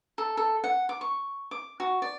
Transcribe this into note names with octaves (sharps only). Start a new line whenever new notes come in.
A4
A4
F#5
D6
C#6
D6
F#4
D5